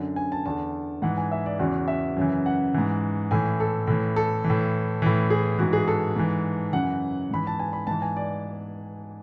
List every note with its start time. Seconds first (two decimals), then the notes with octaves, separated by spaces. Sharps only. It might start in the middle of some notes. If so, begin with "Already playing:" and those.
Already playing: F#2 D3
0.16 G#5
0.32 A5
0.46 E2 D3 A5
1.02 G#2 E3 F#5
1.17 G#5
1.32 E5
1.46 D5
1.59 E2 C#3 E3 F#4
1.88 E5
2.17 F#2 C#3 E3
2.46 F#5
2.74 G#2 E3
3.31 A2 E3 G#5
3.60 A4
3.87 A2 E3
4.16 A4
4.44 E3
4.50 A2
5.02 A2 E3
5.30 G#4
5.59 G#2 E3 F#4
5.73 G#4
5.88 A4
6.16 G#2 E3
6.73 F#2 C#3 E3 F#5
7.31 G#2 E3 B5
7.47 A5
7.60 G#5
7.73 B5
7.87 G#2 E3 A5
8.02 G#5
8.17 D5